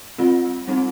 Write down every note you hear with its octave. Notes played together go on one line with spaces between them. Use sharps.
G3 C4 F4
G3 C4 D#4